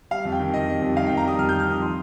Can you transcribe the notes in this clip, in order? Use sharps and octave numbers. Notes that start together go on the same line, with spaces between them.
G3 F5
F2
G5
D#3
F2 D#5
G3
F2
D#3 F5
G5
F2
A#5
G3 D#6
F2 F6
G6
D#3
F6
F2 D#6
F3 C6